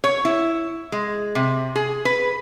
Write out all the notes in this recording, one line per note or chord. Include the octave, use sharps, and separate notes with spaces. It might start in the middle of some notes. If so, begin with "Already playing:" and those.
C#5
E4
G#3
C3
G#4
B4